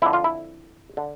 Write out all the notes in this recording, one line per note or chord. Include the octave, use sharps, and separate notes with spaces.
F2 D3 E4
F4
E4
D3